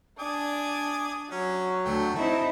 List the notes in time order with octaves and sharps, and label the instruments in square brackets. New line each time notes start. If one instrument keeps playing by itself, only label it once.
[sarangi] D4 [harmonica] G#5 D6 D#6
[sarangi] F#3 [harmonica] C#4
[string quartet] D2 D4 [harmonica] A3 G5
[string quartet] C4 D#4 E4 [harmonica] F#4 A4